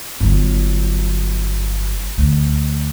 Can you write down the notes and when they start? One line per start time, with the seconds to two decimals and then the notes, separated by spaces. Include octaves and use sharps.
0.20 G1 F#3
2.18 D2